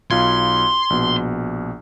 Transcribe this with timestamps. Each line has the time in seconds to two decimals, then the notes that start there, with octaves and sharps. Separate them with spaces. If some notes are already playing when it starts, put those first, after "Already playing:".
0.11 B1 F4 C6 G#6
0.90 A#1 B2